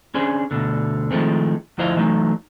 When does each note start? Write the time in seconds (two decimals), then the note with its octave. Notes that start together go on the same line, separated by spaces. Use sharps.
0.14 C#4 D4 G#4 C5
0.51 D2 G2 B2 D3
1.11 D#3 F3 G#3 A3 C4
1.78 D2 F3 E4 C5 D#5 F5
1.96 E3 F#3 A3 D#4